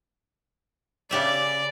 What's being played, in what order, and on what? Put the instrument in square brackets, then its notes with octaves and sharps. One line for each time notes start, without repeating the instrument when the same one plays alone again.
[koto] C#3 G4 E5 [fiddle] D5